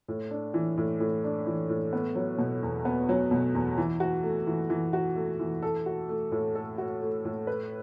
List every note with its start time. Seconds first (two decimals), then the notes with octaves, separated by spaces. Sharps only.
0.08 A2
0.31 D4
0.54 E3
0.77 A2
1.00 A2
1.24 D4
1.47 E3
1.69 A2
1.93 B3
2.16 F#3
2.38 B2
2.63 E2
2.85 B3
3.09 F#3
3.31 B2
3.55 E2
3.78 E3
4.00 F#4
4.23 A3
4.47 E3
4.70 E3
4.93 F#4
5.16 A3
5.39 E3
5.62 A4
5.86 F#4
6.09 A3
6.32 A2
6.55 A4
6.78 F#4
7.02 A3
7.25 A2
7.47 B4